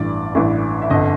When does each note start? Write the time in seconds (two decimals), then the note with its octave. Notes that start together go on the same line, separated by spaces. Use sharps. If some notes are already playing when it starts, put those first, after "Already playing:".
Already playing: A1 G2 E3 D5
0.35 A1 G2 E3
0.82 E5
0.90 G1 F2 D3 D#5